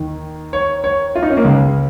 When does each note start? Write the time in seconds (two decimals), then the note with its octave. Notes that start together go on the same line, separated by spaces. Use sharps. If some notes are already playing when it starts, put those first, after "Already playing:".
Already playing: D#2 D#3
0.53 C#5
0.84 C#5
1.15 F4
1.23 D#4
1.30 C#4
1.37 A#3
1.44 C#2 C#3 G#3